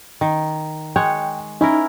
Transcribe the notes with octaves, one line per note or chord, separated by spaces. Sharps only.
D#3
G#3 C#5 F#5 G5
C#4 D#4 E4 A#4